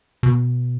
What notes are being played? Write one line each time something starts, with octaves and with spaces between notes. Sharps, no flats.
B2